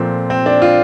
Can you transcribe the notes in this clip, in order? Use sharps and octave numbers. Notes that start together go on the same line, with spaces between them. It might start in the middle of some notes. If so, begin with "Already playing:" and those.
Already playing: A#2 F3 A3 C4
C4
D4
F4